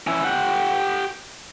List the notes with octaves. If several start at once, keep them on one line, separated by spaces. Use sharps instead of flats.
C#4 E4
G4 F#5